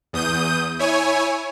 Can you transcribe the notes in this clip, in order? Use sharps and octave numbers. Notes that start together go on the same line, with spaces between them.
E2 D#6 G6 D#7
E4 C#5 G#5